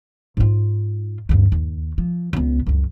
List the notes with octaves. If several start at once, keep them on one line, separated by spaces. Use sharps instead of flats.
G#2 F4
D2 G2
D#2
F3
C#2 B3
C#2 F#2